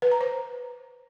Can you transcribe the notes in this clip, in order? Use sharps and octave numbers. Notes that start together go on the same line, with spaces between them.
B4
A#5
C5